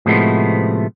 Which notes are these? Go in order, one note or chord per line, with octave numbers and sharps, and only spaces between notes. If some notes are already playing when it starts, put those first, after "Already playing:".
A2 C3 F3 G#3 A3 B3